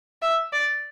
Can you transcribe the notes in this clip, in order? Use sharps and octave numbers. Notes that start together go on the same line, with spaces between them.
E5
D5